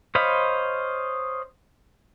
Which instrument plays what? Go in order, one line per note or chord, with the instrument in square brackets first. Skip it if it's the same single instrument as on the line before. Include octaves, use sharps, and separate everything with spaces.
[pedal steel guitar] C5 C#5 D#5 F5 B5